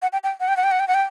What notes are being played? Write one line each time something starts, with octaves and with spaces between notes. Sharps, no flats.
F#5
G5
G5
F#5
G5
F#5
G5
F#5
G5
F#5
G5